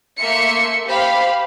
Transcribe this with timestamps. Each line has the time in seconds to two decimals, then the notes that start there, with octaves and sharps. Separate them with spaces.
0.18 A3 A#3 E5 C6 C#7
0.86 G4 C5 F5 B5